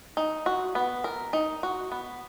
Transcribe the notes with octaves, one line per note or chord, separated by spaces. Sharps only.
D#4
F#4
B3
A#4
D#4
F#4
B3